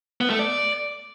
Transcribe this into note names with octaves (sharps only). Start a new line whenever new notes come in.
B3
A3
D5